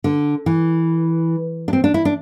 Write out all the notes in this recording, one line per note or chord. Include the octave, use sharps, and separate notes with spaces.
D3
E3
D4
C4
D4
E4
D4